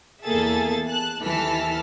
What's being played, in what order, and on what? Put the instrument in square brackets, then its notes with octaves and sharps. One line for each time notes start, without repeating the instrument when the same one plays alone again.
[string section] E2 A#3 G#4 A4 E5 A6
A5 F#6
D#2 E3 A4 A5 F6 B6